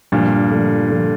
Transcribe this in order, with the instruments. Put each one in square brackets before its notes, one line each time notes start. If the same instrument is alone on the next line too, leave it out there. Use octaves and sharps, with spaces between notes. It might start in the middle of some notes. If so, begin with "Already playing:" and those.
[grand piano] G2 A#2 [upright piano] D3 F3 A3 D4
[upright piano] D3 F3 A3 D4
D3 F3 A3 D4